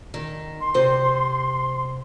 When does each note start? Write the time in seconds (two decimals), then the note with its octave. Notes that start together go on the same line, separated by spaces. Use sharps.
0.14 D#3
0.61 C6
0.74 C3 C5